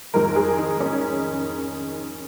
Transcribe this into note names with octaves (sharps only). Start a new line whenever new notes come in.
F2 D#3 G#3 A#4
G#4
D#4
C#4